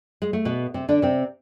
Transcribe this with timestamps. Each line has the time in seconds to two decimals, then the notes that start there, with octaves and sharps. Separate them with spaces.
0.22 G#3
0.33 A3
0.45 B2 B3
0.74 C3 C4
0.89 D3 D4
1.02 C3 C4